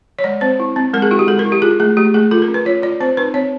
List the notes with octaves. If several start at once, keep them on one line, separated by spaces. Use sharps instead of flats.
C#5
G#3 D5
C4 C5
E4
C4
G#3 A#4
G#4
E4 F#4
G4
G#3 A4
A#4
E4
G4
F4 G#4
A3 G#4
A3 G4
A3 G#4
F4 A4
A#4
C#4
B4
F4 C#5
F4 D5
C4 C5
D#4 B4
C4 C#5